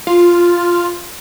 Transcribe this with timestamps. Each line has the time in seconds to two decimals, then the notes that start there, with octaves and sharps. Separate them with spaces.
0.07 F4